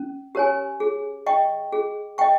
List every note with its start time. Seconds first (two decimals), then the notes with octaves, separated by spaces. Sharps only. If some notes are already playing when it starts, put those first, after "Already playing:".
Already playing: C#4
0.35 G4 A#4 C#5 G#5
0.80 G#4
1.27 D#5 G5 C#6
1.72 G#4
2.18 D#5 G5 C#6